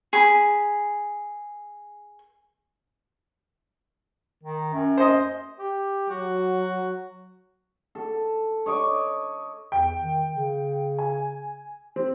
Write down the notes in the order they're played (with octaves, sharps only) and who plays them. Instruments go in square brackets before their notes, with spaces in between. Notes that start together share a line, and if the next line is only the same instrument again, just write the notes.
[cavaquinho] G#4 B5
[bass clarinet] D#3
F#2
[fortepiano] C5 D#5
[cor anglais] G4
[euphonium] F#3 [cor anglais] F#4
[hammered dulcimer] A4
C#5 D#5 C#6 D6
[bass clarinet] E2 [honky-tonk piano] G5
[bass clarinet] D#3
C#3
[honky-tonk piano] G#5
C4